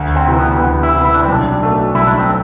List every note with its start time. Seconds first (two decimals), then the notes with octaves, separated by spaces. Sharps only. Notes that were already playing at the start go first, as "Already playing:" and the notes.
Already playing: D2
0.16 C4
0.27 C3 E3
0.39 B3
0.60 D2 B3
0.83 E4
0.95 C3 E3
1.05 E4
1.15 D4
1.23 C4
1.28 B1 D4
1.61 B2 A3
1.95 B1 E4
2.07 D4
2.19 C4